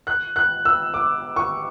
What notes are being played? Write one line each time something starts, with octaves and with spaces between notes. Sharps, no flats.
F#6
F#6
E6
D6
C#6